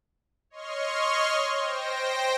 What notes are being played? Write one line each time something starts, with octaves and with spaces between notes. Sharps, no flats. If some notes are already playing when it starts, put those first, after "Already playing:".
C#5 D#5 C6 C#6 F6
C5 G5 A#6